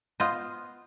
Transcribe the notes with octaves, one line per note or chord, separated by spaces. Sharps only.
B3 F4 C5 D#5